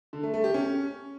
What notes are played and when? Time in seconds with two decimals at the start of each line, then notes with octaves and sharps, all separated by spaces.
0.13 D3
0.23 A3
0.34 A3
0.44 G4
0.54 C#4